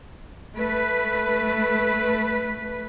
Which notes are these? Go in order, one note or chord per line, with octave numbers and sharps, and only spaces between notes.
A3 B4